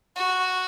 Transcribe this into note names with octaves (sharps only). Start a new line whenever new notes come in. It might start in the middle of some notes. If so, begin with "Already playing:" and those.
F#4